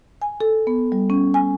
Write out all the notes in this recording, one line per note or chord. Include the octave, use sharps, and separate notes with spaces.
G#5
A4
B3
G3
C#4
G#5